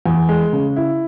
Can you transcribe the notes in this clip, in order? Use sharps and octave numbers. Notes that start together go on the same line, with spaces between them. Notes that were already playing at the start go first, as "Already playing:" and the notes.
E2
G#3
C#3
E4